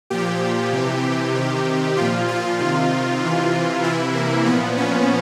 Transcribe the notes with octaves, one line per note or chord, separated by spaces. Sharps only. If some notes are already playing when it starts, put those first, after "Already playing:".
A#2 F3 G4
C3 E3
C3 D#3
A#2 F3 F4
F4
C3 D#3
C3 E3
C3 E3 E4
A#3
A#2 F3 B3
C#4